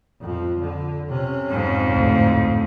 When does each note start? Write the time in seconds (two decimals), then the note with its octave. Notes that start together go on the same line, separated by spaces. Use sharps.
0.21 F2 F3
0.59 D3
1.08 C3 C#4
1.50 F2 G#2
1.91 D2 A2